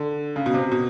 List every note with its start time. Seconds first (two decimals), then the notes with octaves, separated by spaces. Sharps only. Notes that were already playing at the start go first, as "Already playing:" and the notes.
Already playing: D3
0.36 C#3
0.46 B2
0.54 C3
0.72 B2